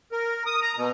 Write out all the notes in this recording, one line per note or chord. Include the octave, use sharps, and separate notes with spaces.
A#4
D#6
A#5
B2